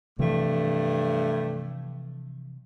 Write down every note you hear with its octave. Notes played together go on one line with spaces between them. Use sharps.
G2 C3 E3 F3 A3